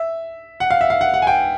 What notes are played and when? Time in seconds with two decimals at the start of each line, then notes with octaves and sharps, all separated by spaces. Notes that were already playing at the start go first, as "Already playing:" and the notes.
Already playing: E5
0.60 F#5
0.71 F5
0.81 E5
0.90 F5
1.01 F#5
1.14 F#5
1.22 G#5
1.27 G5